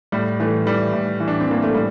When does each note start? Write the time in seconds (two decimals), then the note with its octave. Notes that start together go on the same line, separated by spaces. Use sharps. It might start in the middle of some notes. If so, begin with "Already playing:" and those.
0.12 A2 G3
0.40 E3 A3
0.66 E3 G3
0.93 A2
1.20 E3
1.28 D4
1.40 C4
1.48 E3 A#3
1.62 A3
1.74 A2 G3